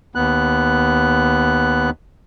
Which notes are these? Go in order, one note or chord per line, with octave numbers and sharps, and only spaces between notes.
D#2 B3 F#6